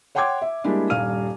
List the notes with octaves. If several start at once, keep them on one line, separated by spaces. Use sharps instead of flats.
C#5 F#5 G5 C6 D6 G#6
E5
G3 G#3 A#3 D4 E4 G4
D#1 G2 F5 F6 D#7